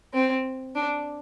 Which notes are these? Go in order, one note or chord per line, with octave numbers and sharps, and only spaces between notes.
C4
D4